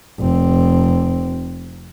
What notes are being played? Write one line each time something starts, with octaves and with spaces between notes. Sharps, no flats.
F1 C4